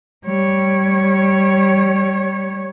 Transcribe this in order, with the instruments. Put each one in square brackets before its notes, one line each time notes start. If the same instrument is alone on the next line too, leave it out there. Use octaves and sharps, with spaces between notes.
[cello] G3 C#5